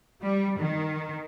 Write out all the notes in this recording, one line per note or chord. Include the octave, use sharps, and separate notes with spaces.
G3
D#3